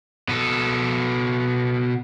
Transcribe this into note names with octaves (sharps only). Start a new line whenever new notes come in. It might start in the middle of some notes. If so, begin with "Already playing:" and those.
B2 A4